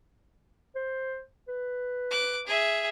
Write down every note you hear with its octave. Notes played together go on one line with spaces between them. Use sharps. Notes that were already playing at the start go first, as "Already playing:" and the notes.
C5
B4
D6 F#6
G#4 E5